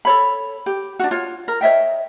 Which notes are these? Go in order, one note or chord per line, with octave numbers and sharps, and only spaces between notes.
A4 C#5 B5
G4
D4 F#4
F4 C#5
A#4
C#5 D#5 E5 G5